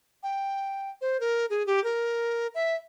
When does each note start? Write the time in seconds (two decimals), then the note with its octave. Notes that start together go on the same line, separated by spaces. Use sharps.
0.23 G5
1.01 C5
1.20 A#4
1.50 G#4
1.66 G4
1.84 A#4
2.55 E5